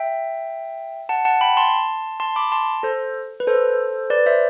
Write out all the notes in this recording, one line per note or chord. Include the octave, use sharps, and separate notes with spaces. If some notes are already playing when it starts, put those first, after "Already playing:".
Already playing: E5 G5
F#5 A5
F#5 A5
G5 B5
A5 C6
A5 C6
B5 D6
A5 C6
A4 C5
B4
A4 C5
B4 D5
C5 E5